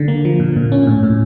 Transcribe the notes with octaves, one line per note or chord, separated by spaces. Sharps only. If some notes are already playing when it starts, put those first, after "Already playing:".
Already playing: D3
A#3
F3
A#2
A#2
C#4
A2
A2